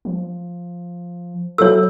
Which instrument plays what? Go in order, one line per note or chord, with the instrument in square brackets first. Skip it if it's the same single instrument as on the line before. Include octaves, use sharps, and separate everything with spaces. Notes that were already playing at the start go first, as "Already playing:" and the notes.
[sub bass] F3
[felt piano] F#3 E4 A4 [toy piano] C#5 E6